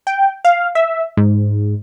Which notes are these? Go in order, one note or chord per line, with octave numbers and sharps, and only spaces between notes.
G5
F5
E5
G#2